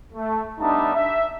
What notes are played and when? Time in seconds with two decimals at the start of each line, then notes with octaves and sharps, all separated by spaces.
0.13 A3
0.60 G3 B3 D4 D#4 E5 A5
0.94 E5